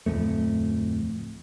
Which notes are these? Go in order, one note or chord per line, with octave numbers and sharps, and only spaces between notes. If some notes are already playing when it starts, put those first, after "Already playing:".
D1 C2 F2 A3